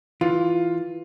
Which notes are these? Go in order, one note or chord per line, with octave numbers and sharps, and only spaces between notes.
E3 F4